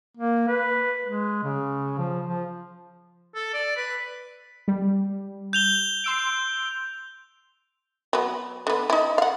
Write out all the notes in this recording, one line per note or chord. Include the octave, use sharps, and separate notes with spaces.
A#3
B4
G#3
C#3
F3
F3
A4
D5
B4
G3
G6 F7 G7
C6 E6 D7
F#3 B3
D3 B3
D#4 E4
F5 F#5